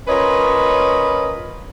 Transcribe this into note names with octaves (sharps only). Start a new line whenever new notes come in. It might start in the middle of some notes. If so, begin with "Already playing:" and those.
C#4 F4 A#4 B4 C#5 D#5